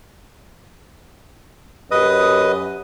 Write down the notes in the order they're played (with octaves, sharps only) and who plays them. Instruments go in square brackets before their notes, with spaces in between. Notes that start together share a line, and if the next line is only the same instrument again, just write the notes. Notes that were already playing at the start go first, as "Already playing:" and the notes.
[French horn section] F#2 G4 [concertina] B4 D#5 D#6